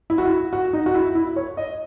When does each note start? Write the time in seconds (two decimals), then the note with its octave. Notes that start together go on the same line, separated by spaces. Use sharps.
0.10 E4
0.18 F#4
0.25 E4
0.53 F#4
0.73 D#4
0.86 F#4
0.94 E4
1.15 E4
1.36 C#5
1.57 D#5